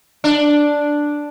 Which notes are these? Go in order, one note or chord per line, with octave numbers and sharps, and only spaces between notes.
D4